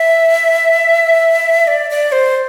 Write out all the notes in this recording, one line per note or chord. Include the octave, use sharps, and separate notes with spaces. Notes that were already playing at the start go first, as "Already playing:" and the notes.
Already playing: E5
D5
D5
C5